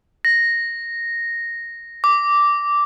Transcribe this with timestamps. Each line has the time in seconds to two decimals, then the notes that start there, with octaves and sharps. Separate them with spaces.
0.25 A#6
2.04 D6